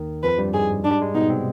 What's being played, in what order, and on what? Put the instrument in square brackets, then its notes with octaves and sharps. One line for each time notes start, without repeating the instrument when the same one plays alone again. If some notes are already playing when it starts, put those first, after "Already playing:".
Already playing: [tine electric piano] D#2 D#3
[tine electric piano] F2 F3 [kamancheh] B4
[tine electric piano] G2 G3
[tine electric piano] G#2 G#3 [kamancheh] G#4
[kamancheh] D4
[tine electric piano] G3
G#3
[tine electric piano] B2 B3 [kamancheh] D#4
[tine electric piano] C3 C4